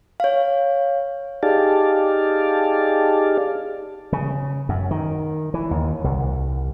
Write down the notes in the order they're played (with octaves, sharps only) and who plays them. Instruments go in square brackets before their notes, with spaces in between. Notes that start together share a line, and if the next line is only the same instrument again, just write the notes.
[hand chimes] C#5 F5
[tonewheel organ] D#4 G4 G#4 D5 F5 A5
[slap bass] C#3
F#2
D#3
E3
D#2
C2